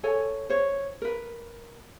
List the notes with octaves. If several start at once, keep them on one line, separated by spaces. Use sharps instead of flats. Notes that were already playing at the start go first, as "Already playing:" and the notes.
A4 C#5 G#5
C5 C#5
A#4 B4